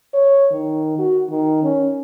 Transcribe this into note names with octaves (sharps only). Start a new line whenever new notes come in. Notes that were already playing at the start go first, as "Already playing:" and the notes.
C#5
D#3
F#4
D#3
C#4